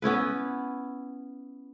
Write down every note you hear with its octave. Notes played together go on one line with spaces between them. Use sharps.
B3 C#4 E4 B4